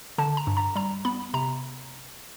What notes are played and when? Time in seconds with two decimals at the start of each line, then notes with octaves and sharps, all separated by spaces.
0.18 D3 A5
0.37 A#5
0.47 G2
0.57 A#5
0.75 G3 A#5
1.05 B3 B5
1.34 C3 A#5